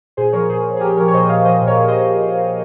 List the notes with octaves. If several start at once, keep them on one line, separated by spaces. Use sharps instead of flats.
A#2 G#4 C5
F3 A#4 C#5
A#2 G#4 C5
F3
G#4
F3 G4 A#4
F3 A#4 C#5
C#5
A#2 C5 D#5
D#5
A#2 C#5 F5
F3 C5 D#5
A#2
A#4 C#5
A#2
C5 D#5
A#2